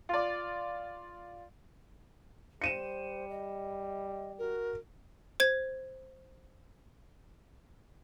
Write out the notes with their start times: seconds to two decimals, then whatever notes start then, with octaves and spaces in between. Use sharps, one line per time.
0.09 F4 D5
2.62 G3 C5 C#7 D#7 E7
3.30 D#5
4.39 F#4 A#4
5.40 C5 G#6